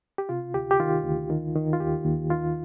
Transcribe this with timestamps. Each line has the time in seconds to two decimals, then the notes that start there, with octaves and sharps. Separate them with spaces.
0.18 G4
0.29 C3 F4
0.54 D2 G4
0.71 G4
0.80 D#3 F4
1.04 D2
1.30 D#3
1.55 D#3
1.73 F4
1.80 D#2 G4
2.05 D#2
2.30 D#3 F4